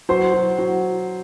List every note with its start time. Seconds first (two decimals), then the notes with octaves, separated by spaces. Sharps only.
0.09 F#3 C5 C6
0.33 F#3
0.59 F#3